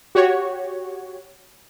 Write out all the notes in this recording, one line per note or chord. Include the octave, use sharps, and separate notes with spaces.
F#4 G4 C#5